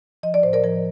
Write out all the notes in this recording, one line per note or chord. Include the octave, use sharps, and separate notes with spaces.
F3 D#5
D5
A2 C5
A#4 D5
F3 A#4 D5